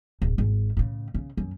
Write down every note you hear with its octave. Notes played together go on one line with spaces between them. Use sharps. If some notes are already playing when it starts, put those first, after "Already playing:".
D1
G#1
A2 C#3
C#3
F#2